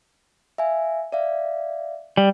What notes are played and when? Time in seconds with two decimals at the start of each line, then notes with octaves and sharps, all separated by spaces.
0.58 E5 F5 G#5
1.12 D5 E5 F5
2.17 G3